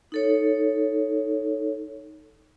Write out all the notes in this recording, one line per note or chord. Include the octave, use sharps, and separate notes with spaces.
D#4 A4 C#5